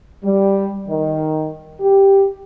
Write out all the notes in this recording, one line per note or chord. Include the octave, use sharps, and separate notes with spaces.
G3
D#3
G4